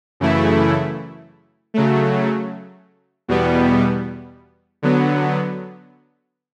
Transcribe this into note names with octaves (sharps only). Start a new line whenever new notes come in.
F#2 C#3 E3 A3 E4
C#3 F#3 A3
E2 B2 G3 B3
D3 F#3 B3